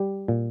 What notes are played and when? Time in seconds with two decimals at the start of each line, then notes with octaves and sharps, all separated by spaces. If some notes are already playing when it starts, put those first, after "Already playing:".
Already playing: G3 G4
0.28 A#2